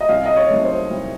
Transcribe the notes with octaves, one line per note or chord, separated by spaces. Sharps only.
D#5
C2 F5
D#5
C#5
C3 D#3 F#3 A3
C5
C2